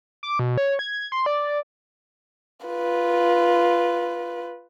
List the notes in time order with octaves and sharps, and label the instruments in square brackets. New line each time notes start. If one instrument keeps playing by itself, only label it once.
[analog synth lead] D6
B2
C#5
G#6
C6
D5
[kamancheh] F4 B4